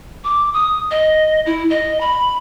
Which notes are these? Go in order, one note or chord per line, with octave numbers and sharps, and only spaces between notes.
D6
D#6
D#5
E4
D#5
B5